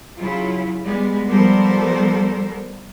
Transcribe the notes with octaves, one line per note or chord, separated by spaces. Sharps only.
C#3 F#3 E4 F4
G3 G#3 B3
F3 G3 B3 A4 A#4 C5